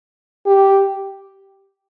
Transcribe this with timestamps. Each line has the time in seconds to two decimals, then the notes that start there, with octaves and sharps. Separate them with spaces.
0.46 G4